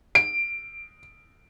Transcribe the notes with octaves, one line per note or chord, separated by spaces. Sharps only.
D7